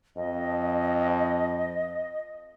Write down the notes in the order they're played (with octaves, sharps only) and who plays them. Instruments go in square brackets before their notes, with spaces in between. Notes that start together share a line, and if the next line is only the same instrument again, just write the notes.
[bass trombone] F2 [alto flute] D#5